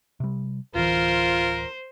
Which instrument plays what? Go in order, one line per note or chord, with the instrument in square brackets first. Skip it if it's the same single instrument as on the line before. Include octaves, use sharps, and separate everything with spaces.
[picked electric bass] C3 G3
[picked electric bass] D1 E3 [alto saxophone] F4 [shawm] A#4 [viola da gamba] C5